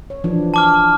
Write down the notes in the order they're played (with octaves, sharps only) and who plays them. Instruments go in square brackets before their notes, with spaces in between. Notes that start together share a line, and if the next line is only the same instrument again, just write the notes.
[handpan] C#5
E3 F3 D4
[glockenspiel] A5 D6 F6